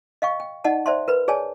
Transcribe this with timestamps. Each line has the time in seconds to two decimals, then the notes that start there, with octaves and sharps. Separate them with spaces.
0.22 D#5 F5 G5 C#6
0.40 G5
0.64 D#4 D5 D#5 F#5 A5
0.86 C5 D5 E5 A5 C6
1.08 A#4 B4 B5
1.28 G#4 C#5 D5 G#5 A5